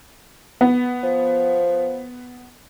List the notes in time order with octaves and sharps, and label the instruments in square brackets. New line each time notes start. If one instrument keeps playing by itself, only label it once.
[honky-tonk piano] B3
[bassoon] F3